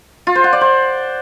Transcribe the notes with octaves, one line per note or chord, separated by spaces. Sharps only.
F4
C5
F#5
D5
C5